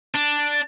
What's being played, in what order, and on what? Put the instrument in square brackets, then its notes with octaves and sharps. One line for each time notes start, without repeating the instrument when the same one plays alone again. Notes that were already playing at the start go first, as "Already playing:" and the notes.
[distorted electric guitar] D4